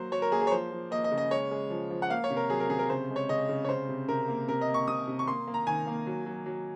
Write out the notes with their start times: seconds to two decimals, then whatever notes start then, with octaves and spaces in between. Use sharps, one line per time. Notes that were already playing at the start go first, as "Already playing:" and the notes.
Already playing: F#3 A#3 C5
0.12 F#3 C#5
0.22 A#4
0.31 A#3 G#4
0.41 G#4
0.47 C#5
0.52 F3 C5
0.71 F3
0.91 A#3 D#5
1.04 D#5
1.11 C#3
1.18 D#5
1.31 G#3 C#5
1.51 G#3
1.70 F3
1.90 F3
2.02 F#5
2.10 A#3 F5
2.24 C#5
2.30 C3
2.37 A#4
2.50 F#3 G#4
2.60 A#4
2.70 C3 G#4
2.79 A#4
2.89 C#3 C5
3.10 G#3
3.16 C#5
3.29 C#3 D#5
3.49 C#3
3.64 C#5
3.69 C3 C5
3.89 C3
4.08 C3 A#4
4.28 A#3
4.48 C3 A#4
4.61 D#5
4.68 A#3
4.74 C#6
4.88 C3 D#6
5.07 C3
5.19 C#6
5.27 A#3 C6
5.47 A#3
5.54 A#5
5.67 D#3 G#5
5.87 A#3
6.07 F#3
6.26 F#3
6.46 F#3